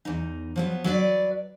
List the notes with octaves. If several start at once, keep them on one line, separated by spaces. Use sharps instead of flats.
E2 D#4
F3 F#3 B3
F#3 B4 D5